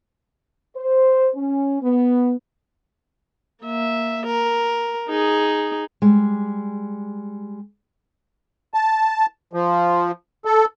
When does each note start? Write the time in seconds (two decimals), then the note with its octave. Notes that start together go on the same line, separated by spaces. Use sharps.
0.76 C5
1.35 C#4
1.82 B3
3.63 A#3 E5
4.26 A#4
5.09 D#4 G#4
6.02 G3 G#3
8.74 A5
9.53 F3
10.45 A4